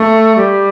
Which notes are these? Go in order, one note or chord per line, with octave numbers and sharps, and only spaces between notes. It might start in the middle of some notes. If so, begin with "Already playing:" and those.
Already playing: A3
G3